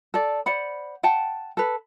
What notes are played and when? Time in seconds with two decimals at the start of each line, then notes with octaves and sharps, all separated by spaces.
0.14 A4 D5
0.46 C5 D5 F#5 B5
1.03 F#5 G5 A5
1.57 A4 B4